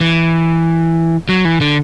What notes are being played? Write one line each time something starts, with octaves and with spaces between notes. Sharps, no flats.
E3
F#3
E3
D3